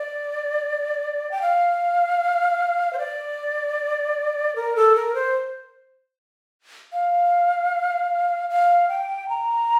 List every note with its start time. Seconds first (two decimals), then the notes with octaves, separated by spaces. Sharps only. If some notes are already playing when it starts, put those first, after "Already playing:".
Already playing: D5
1.31 G5
1.42 F5
2.93 C5
2.98 D5
4.56 A#4
4.76 A4
4.96 A#4
5.15 C5
6.93 F5
8.50 F5
8.89 G5
9.29 A#5